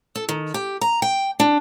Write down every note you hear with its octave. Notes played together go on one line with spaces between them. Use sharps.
A4
D#3
G4
A#5
G5
D4